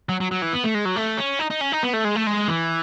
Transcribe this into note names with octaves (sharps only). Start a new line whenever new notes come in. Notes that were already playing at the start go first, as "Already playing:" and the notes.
F#3
F#3
F#3
E3
B3
A3
G#3
F#3
A3
C#4
D#4
D#4
C#4
D#4
B3
A3
G#3
A3
G#3
E3